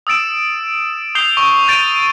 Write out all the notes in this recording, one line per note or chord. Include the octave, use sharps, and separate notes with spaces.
D#6 E6 A6 D7 E7
D#6 G6 C7 F7 G7
C#6
G6 A6 D7 D#7